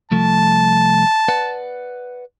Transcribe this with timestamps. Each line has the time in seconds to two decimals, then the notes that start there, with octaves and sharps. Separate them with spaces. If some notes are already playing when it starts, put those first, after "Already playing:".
0.11 C2 F3 A3 A5
1.28 B4 D5 F#5